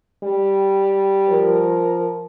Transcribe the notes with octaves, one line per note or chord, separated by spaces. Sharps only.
G3
F3 A#4